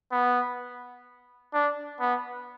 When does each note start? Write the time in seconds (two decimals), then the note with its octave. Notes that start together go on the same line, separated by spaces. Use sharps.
0.12 B3
1.54 D4
2.00 B3